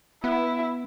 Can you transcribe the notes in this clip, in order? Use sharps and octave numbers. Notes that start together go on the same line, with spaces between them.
B3 E4